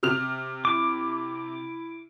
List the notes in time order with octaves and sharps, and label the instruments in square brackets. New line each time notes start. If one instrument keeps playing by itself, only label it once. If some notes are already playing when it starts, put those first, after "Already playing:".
[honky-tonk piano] C3 F6 F7
[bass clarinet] E4 [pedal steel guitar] D6